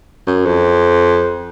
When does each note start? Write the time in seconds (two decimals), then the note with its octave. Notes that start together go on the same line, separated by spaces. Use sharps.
0.27 F#2
0.46 F2